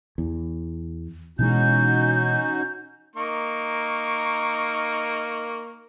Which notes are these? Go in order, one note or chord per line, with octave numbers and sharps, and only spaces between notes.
E2
B2 E3 G#3 C#4 D#4 F#4 G6
A#3 D#4 C#6